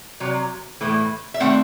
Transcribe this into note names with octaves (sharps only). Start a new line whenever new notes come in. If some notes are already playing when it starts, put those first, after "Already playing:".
C3 F#3
A2 E3 A3
E5
D#3 A3 C4 F#5